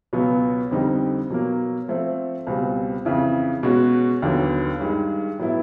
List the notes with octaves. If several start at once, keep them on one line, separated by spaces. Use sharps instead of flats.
C#2 B2 F#3 B3
F2 D3 G3 C4 D#4
B2 F#3 A#3
F3 A3 C4
C#2 B2 G3 C4
F2 C#3 E3
B2 G#3 C#4 F#4
D#2 D3 F#3 B3
G2 D#3 G#3
A2 F#3 B3 E4